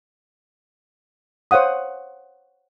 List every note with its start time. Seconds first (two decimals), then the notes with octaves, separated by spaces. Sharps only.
1.51 C5 C#5 F5 F#5 D#6